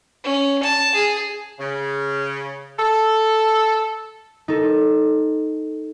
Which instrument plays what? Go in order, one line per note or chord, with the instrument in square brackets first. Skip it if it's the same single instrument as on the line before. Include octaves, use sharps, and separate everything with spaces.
[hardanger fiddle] C#4
A5
G#4
[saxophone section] C#3
A4
[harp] D#4 A4